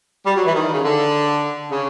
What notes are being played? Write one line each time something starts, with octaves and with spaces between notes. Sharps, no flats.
G3
F#3
E3
D#3
C#3
D3
C#3